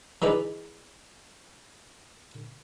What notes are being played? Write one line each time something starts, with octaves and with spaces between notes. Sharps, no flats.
E3 G#3 D#4 B4 D5